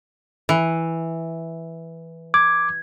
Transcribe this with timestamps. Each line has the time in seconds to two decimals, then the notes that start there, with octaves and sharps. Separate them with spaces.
0.49 E3
2.34 D6 G#6